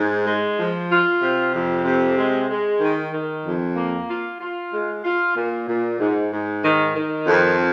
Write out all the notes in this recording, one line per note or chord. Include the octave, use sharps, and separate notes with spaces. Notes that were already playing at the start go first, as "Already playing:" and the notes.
Already playing: G#2
G#3
F3
F4
C3
F2
C3
G#3
G#3
D#3
D#3
F2
A#3
F4
F4
G#3
F4
A#2
A#2
G#2
G#2
D#3
D#3
F2